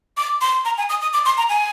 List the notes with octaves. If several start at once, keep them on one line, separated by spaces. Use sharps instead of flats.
D6
C6
A#5
G#5
D#6
D#6
D6
C6
A#5
G#5